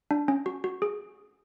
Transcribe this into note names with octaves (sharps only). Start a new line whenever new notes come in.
D4
C#4
F#4
F#4
G#4